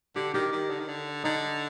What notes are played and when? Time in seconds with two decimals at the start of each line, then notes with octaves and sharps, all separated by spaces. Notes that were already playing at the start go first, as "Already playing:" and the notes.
0.15 D3 G4
0.34 D#3 G4
0.52 D#3
0.70 D3
0.80 D#3
0.88 D3
1.24 D3 D#4